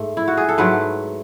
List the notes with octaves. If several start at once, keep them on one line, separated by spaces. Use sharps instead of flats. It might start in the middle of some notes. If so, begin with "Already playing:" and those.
Already playing: G#2 A3
E4
F#4
G#4
A4
G#2 F#3 A3 B4